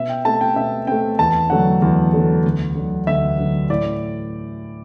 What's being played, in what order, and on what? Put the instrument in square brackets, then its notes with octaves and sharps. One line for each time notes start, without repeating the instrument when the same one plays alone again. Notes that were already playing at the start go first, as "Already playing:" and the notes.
Already playing: [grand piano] B2 E5
G5
A3 C4 A5
G5
B2 E5
A3 C4 G5
E2 A5
D3 F#3 A3 F#5
E2
D3 F#3 A3
D2
D3 F#3
D2 E5
D3 F#3
A2 D5